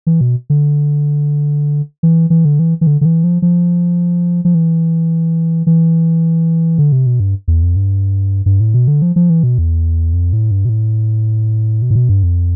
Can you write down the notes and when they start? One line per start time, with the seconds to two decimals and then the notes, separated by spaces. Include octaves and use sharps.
0.07 E3
0.21 B2
0.50 D3
2.03 E3
2.30 E3
2.45 D3
2.59 E3
2.81 E3
2.87 D3
3.01 D3
3.05 E3
3.24 F3
3.42 F3
4.45 F3
4.55 E3
5.67 E3
6.78 D3
6.92 C3
7.06 B2
7.20 G2
7.48 E2
7.63 F2
7.76 G2
8.46 G2
8.60 A2
8.74 B2
8.88 D3
9.02 F3
9.16 F3
9.30 E3
9.43 B2
9.58 E2
10.13 F2
10.33 A2
10.51 G2
10.65 B2
10.69 A2
11.82 B2
11.91 A2
11.95 B2
12.09 G2
12.23 F2